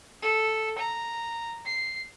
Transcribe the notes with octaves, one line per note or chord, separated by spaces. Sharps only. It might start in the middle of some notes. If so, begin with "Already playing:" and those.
A4
A#5
C7